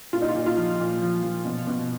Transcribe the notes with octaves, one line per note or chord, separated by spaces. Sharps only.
A#2 F4
D#4
F4
A#2
F4
F3
A#2
F3
F3
B2
B2